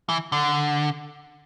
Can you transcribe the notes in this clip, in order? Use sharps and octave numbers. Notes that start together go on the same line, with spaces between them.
E3
D3